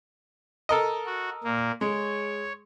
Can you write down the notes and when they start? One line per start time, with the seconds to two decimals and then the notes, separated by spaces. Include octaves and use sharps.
0.69 A4 A#4 D#5
1.06 F#4
1.44 A#2 A#3
1.81 G#3 C#5